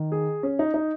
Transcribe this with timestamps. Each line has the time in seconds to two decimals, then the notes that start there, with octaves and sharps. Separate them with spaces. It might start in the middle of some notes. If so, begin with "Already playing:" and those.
Already playing: D#3
0.12 G#4
0.43 C#4
0.59 D#4
0.74 D#4